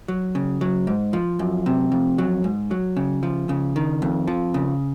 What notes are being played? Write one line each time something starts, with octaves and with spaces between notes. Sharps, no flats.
F#3
C#3
F#3
G#2
F3
F#2
C3
F2
F#3
G#2
F#3
C#3
F3
C#3
D#3
F2
F3
C#3